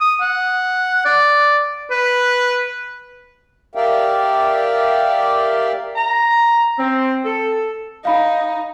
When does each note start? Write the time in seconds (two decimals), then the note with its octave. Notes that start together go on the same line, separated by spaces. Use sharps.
0.01 D#6
0.21 F#5
1.05 D5
1.90 B4
3.75 G4 A#4 D5 E5 F5 G5
5.96 A#5
6.78 C4
7.25 A4
8.05 D#4 F5 B5